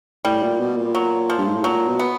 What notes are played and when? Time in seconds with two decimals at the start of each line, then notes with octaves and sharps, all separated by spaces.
0.25 A2 G3
0.42 A#2
0.60 B2
0.77 A#2
0.95 F#3
1.30 F3
1.38 G2
1.46 G#2
1.56 A2
1.64 A#2 F#3
1.87 B2
1.99 B3